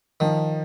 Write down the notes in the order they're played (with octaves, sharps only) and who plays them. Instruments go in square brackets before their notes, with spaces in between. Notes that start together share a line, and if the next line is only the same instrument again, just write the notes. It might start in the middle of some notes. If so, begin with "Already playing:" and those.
[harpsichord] D#3 [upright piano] F3